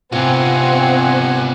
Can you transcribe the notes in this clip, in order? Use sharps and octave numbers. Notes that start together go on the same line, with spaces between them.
C3 B3 C4 E4 F4 F#5 G#5